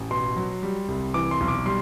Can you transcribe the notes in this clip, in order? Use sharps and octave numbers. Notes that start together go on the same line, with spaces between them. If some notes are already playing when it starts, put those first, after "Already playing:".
Already playing: A1
B2 C6
F#3
G3
C2
E3 D6
C6
B1
D6
G3 C6